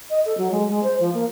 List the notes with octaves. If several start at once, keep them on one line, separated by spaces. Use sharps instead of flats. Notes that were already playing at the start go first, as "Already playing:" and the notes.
D#5
A4
F#3
G#3
G#3
C5
F3
A#3